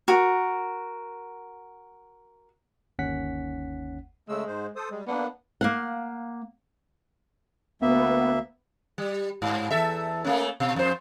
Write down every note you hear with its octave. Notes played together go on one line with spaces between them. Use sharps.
F#4 A#4
G1 D#2 C#4 F#5 B6
C#3 G#3 A3 E6
G#2 C5
A4 C5 D#6
G3 G#3
A#3 B3 D4
A#3 F5 F#5
D2 A#3 B3 E5
G3
G#2
E2 A4 E5
A3 A#3 C#4
B2
F2 C5